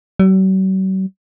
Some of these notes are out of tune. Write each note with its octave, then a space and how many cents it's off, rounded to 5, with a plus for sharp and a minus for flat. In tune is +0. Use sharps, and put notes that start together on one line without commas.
F#3 +45